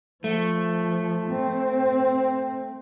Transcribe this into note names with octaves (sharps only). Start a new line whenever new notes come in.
F3 A3
C4